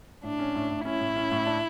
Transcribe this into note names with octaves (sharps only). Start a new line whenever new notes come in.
A2 D4
C#4
A2
A2
C#4 E4
A2
C#4
A2
D4